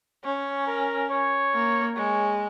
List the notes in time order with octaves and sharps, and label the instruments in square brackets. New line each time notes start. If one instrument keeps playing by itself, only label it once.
[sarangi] C#4 [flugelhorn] C#5
[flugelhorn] A#4
C#5
[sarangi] A#3
[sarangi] G#3 [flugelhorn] C#5